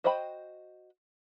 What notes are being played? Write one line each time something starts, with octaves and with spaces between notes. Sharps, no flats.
F#4 C5 D#5 G5 B5